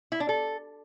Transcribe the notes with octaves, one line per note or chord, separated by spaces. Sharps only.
E4
D4
A4